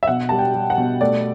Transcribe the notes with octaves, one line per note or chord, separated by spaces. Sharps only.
E5
B2 F#5
G3 A5
G5
G3
F#5
B2
A3 D5